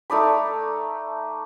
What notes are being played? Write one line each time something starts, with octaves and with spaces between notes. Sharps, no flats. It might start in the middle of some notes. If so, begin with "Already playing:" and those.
A3 D#4 D5 B5